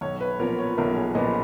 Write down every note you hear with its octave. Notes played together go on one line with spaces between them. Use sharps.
B1 C#5
B4
A#2 F3 B3 A#4
C#5
B1 A#4
G#4
A#2 F3 B3 D#5